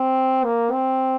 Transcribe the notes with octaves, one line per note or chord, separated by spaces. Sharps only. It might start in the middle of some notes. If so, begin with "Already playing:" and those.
Already playing: C4
A#3
C4